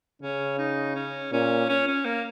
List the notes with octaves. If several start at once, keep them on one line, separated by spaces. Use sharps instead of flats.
C#3 C#4
D#4
C#4
A#2 C#4
C#4
C#4
A#3